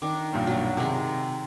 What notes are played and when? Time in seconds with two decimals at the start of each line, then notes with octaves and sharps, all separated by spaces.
0.02 D#3 D4 D6
0.33 B1 G2 A#2
0.47 F#3 D4
0.77 C3 D#3 G#3